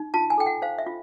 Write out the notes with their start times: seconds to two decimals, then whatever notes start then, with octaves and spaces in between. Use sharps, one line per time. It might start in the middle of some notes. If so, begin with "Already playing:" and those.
Already playing: D#4
0.14 F4 A5
0.30 G#5
0.38 A4 G5
0.46 F#5
0.62 C5 F5
0.78 E5
0.86 F4